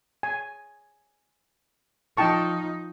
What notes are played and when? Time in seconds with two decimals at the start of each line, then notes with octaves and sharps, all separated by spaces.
0.23 G#5
2.17 F3 D#4 G5 A5 C#6